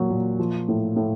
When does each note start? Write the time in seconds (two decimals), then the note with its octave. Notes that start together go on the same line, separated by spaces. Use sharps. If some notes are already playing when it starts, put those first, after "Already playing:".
Already playing: A#2 F#3
0.10 A#2
0.39 F3
0.68 A2
0.96 A2